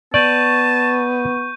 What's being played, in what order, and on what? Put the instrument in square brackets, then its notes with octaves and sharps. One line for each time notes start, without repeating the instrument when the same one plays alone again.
[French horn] B3 [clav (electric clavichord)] D5 [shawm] A5 [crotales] C#6 G6 D#7